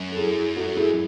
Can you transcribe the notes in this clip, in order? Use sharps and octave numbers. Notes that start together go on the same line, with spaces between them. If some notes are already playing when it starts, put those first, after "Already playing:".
Already playing: F#2
A4
E4 G#4
F#4 A4
E4 G#4